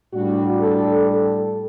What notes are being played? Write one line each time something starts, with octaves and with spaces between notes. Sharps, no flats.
A2 G3 D4 F#4
A4
A4